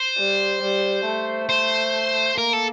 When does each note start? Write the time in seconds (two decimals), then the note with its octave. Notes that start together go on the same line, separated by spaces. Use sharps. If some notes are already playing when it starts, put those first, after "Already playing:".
Already playing: C5
0.18 G3
0.62 G3
1.06 A3
1.50 C5
2.38 A#3 A#4
2.53 A4